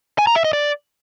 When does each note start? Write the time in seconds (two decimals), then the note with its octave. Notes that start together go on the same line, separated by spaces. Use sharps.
0.18 G#5
0.27 A#5
0.36 E5
0.44 D#5
0.53 D5